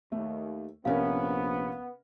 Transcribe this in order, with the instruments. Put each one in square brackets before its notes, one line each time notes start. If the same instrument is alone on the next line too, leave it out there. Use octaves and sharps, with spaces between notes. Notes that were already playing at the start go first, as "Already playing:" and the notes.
[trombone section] D#2 [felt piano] A3
[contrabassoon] A#1 [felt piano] C3 C#4 A#4 [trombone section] B3 [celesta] F5